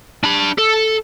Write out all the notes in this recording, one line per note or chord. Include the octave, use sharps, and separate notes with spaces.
D4 B5
A4